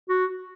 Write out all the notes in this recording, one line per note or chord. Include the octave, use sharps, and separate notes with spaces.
F#4